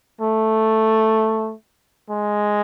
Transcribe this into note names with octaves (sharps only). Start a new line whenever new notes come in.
A3
G#3